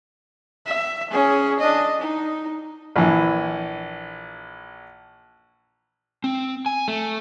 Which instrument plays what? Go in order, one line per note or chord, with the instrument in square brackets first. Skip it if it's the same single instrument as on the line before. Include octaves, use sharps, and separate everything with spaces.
[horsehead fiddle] E5
C#4 G#4
D4 D#5
D#4
[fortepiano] A#1 E3
[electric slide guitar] C4
G#5
A3